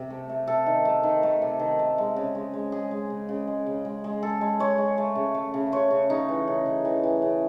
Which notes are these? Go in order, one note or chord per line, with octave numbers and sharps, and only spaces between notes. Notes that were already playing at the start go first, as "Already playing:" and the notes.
Already playing: C3
A3
A3
C3 A4
D#3
A3
D#3
A3
C3
D#3
A3
G#3
C#3
G#3
G#3
G#3 G#4
G#3
C#3
C#3
G#3
C#3
G#3
G#3
G#3 A4
G#3
G#3 C#5
G#3
A3
C#3
A3
C#3
C#3 C#5
C#3
C#3 D#4
E3
C#3
C#3
E3
E3
C#3